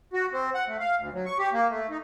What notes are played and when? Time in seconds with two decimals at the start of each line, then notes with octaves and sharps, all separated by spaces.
0.13 F#4
0.32 C4
0.54 F#5
0.68 A3
0.80 F5
0.98 D2
1.13 F#3
1.26 C#6
1.38 G4
1.53 A#3
1.70 A3
1.90 D#4